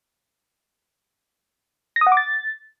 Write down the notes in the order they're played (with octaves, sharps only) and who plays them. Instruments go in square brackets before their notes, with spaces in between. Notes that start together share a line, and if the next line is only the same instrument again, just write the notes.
[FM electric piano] A#6
D#6
F#5
D6
A6